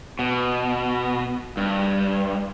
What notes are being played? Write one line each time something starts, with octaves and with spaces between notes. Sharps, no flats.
B2
G2